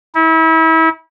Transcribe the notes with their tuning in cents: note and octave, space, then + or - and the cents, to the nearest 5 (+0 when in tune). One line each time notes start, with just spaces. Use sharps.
E4 -35